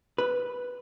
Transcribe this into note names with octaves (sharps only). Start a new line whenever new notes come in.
B4